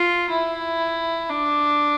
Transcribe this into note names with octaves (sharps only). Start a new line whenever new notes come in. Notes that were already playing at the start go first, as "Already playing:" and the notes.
Already playing: F4
E4
D4